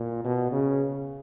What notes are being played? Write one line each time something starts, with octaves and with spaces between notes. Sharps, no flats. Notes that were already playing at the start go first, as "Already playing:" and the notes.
Already playing: A#2
B2
C#3